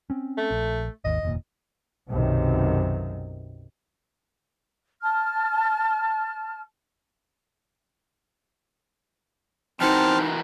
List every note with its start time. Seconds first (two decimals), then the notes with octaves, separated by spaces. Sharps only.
0.10 C4 C#4
0.38 A3
0.51 A#1
1.05 G#1 D#2 D#5
1.23 F1 D#2 A#2
2.09 B1 F#2 C3 D#3
5.01 A5 F6
9.81 E3 C4 D#4 F#4 A#4 A5 F6